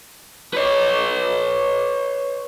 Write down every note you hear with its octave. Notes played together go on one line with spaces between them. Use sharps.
B4 C#5